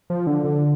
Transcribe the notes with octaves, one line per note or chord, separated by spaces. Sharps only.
F3
D3
D3